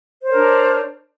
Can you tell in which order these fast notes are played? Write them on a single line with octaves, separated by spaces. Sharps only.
C5 C#5 A#4 D4